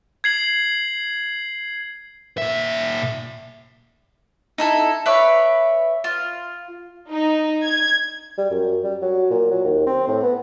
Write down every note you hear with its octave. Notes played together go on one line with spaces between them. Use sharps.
G#6 C7 F#7
A#2 E5
D#4 E4 A4
B4 C#5 D5 E5
F4
D#4
G#6
G3
F#2
G3
F#3
A#2
F#3
D#2
C4
A2
B3